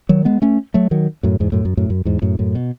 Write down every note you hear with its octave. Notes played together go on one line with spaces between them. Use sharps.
D#3 F#3
G#3 B3
A3 C#4
F#3 A3
D#3 F#3
F#2 A2
E2 G#2
F#2 A2
F#2
F#2 A2
F#2
E2 G#2
F#2 A2
F#2 A2
B2